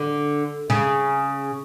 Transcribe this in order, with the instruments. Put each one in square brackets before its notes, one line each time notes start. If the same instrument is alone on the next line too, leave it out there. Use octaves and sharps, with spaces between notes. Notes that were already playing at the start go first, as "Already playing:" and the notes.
Already playing: [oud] D3
C#3